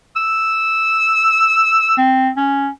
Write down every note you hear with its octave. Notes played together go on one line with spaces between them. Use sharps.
E6
C4
C#4